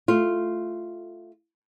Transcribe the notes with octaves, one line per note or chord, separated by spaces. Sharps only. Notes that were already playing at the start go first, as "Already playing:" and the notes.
A3 F4